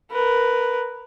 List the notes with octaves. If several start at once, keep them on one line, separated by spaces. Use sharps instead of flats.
A#4 B4